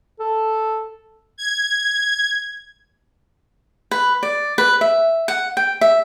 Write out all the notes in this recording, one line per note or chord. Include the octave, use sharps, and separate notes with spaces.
A4
G#6
B4
D5
B4
E5
F#5
G5
E5